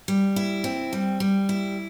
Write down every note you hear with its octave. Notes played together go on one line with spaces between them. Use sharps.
G3
E4
C4
G3
G3
E4